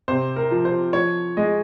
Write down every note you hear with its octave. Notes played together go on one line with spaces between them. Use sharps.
C3 C5
A#4
F3
C5
F3 C#5
G#3 D#5